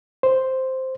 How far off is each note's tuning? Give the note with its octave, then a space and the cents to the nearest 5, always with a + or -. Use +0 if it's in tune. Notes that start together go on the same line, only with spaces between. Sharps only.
C5 +0